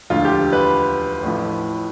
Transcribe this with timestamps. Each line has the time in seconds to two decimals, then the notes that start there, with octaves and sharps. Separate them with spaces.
0.10 E1 D2 D3 F3 F4
0.25 G4
0.53 B4
1.23 A1 A2 F3